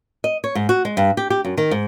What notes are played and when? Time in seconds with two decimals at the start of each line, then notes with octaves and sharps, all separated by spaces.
0.24 D#5
0.44 C#5
0.55 G#2
0.69 F#4
0.85 G#3
0.97 G2
1.17 G4
1.30 G4
1.45 F#2
1.57 D#3
1.71 G#2